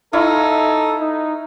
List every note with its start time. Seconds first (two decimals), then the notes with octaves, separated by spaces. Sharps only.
0.13 D#4 E4 A4 F5 C#6
1.01 D#4